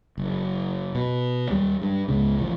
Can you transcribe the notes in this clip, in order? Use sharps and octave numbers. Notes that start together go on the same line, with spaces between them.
F#1
B2
D#2 G3
G2
C#2 G#2 C#3
A1 F3